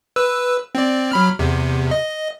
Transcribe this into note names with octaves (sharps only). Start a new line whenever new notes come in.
B4 E6
C4 D5
F#3 B5 F6
E2 C3
D#5